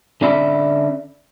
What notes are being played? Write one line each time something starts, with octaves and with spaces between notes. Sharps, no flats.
D3 C#4 D5 E5 B5